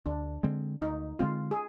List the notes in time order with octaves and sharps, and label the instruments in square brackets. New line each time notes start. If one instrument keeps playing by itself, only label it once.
[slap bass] D2 [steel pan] D4
[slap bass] D3 G#3 C4
[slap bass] D2 [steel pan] D#4
[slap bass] D3 G#3 C4 [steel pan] F4
[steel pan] G#4